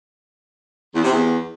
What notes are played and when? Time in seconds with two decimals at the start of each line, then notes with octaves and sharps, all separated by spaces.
0.95 E2
1.04 C3
1.13 E2